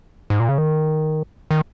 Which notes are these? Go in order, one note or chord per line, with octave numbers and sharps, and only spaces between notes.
G#2
A#2
C#3
D#3
D#3